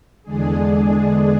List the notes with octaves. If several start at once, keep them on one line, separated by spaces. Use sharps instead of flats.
E2 D3 G#3 D4 G#4